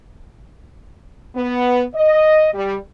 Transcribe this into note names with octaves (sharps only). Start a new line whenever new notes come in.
B3
D#5
G3